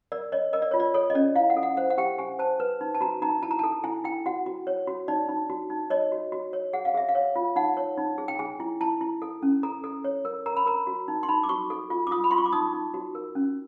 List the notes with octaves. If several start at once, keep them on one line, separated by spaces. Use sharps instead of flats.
A#4 D5
C#5 D#5
A#4 D#5
D5
F4 C#5
D5
A4 C#5
D#5
C#4 D5
E4 F5
F#5
A4
F#5
C5 F#5
F#5
G4 G5
G4 G#5
C5 A5
B4
D#4
A5
F#4 A#5
D#4 A#5
E4 A5
A#5
A4 A5
E4 G#5
E4 G5
F#4 F#5
F#4
C#5
F#4
D#4 D5
D#4
F#4
D#4
C#5 D#5
F#4
F#4
C#5
G#4 F#5
F5
G#4 E5
F5
C#5
F4
D#4 F#5
C#5
D#4
G#4
G5
G#4 G#5
E4
E4 A5
E4
A4
C#4
A4 A#5
A4
C#5
A#4
A#4 A#5
B5
A#4 A#5
F#4
D#4
C6
D#4 B5
D6
F#4 C#6
A4
F4
D6
F4 D#6
B5
F4 C6
C#6
D6
D#4 D#6
D#4
F#4
A#4
C#4